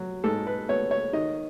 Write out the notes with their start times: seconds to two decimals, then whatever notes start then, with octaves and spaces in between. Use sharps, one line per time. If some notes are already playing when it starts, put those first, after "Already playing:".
Already playing: F#3
0.24 G#2 A4
0.47 B4
0.69 B3 C#5
0.91 C#5
1.13 D#3 D#5